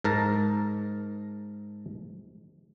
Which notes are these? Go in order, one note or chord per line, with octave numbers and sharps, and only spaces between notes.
G#2 A#4 A5 A#5